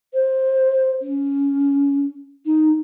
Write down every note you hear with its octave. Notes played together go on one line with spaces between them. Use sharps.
C5
C#4
D#4